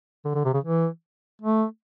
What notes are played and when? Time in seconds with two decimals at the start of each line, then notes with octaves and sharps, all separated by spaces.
0.25 D3
0.35 D3
0.45 C3
0.54 C#3
0.64 E3
1.42 A3